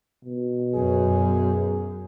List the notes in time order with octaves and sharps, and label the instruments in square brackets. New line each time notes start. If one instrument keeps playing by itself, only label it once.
[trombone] B2
[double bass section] F#2 [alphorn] G#4